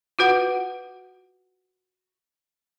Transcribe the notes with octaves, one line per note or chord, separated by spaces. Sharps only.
F4 F#4 B4 F#5